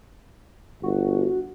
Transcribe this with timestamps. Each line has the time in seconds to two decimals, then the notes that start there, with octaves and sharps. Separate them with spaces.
0.83 G1 F#4